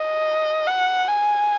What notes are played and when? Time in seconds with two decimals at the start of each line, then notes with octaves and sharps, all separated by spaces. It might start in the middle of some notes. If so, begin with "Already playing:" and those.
Already playing: D#5
0.67 F#5
1.08 G#5